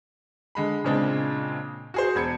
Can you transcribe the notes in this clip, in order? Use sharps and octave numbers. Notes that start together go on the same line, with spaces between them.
D3 G#3 B5
A#2 C#3 G#3 C4 D4
F#4 G#4 C5
E1 B5 G#6 C#7